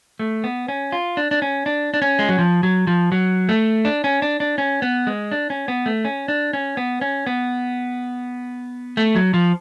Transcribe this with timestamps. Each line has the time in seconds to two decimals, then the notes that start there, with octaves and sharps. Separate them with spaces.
0.20 A3
0.44 B3
0.68 C#4
0.92 F4
1.17 D4
1.31 D4
1.42 C#4
1.66 D4
1.94 D4
2.02 C#4
2.19 G#3
2.29 F#3
2.39 F3
2.63 F#3
2.87 F3
3.12 F#3
3.49 A3
3.85 D4
4.04 C#4
4.22 D4
4.40 D4
4.58 C#4
4.82 B3
5.07 G#3
5.32 D4
5.50 C#4
5.68 B3
5.86 A3
6.05 C#4
6.28 D4
6.53 C#4
6.77 B3
7.01 C#4
7.27 B3
8.97 A3
9.15 F#3
9.34 F3